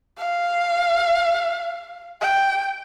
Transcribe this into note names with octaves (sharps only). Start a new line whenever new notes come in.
F5
G5